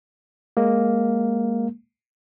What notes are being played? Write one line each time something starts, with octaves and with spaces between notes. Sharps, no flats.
G#3 A#3